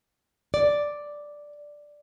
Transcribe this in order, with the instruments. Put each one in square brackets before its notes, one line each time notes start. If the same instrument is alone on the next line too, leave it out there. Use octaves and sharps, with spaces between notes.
[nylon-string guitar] D5